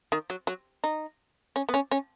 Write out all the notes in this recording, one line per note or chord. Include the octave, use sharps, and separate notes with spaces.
D#3
F#3
F#3
D#4
C#4
B3
C#4
C#4